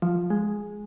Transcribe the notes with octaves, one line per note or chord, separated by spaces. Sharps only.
F3
G#3